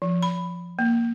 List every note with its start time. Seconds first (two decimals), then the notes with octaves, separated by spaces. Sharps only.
0.02 F3
0.23 B5
0.79 A#3